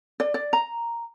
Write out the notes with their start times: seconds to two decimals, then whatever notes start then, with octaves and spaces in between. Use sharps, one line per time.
0.20 D5
0.34 D5
0.53 A#5